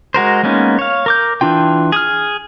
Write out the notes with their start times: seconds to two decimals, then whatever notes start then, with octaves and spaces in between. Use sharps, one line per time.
0.14 G#3 F#4 A#4 C5
0.43 G#3 A#3 B3 C#4 D#4
0.79 C#5 F5
1.06 A#4 D6 G6
1.41 E3 D4 F4 G5
1.92 G#4 D#6 F6